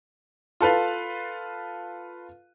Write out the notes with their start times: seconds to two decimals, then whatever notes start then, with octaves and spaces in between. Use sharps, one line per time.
0.61 F4 A4 B4 F5